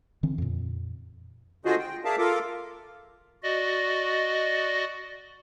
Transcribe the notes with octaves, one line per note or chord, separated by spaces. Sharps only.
D3 E3 C4
F2 A#2
D3 F4 F#4 G#4 C5 D#5
G5
G#4 A#4 D5 E5 F5 A5
F4 A4 A#4 F5 D6
F#4 D5 D#5